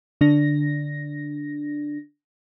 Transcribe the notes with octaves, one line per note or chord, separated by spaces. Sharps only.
D3 D4 A#6